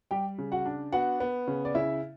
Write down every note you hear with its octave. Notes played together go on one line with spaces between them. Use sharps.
G3 G4 G5
C#3
F#4 F#5
D4
B3 F#4 F#5
B3
C#3
D5
C#3 E4 E5